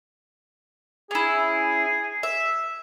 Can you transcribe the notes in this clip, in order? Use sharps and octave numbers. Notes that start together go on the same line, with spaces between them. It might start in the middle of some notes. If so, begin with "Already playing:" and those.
C#4 E4 G#4
E5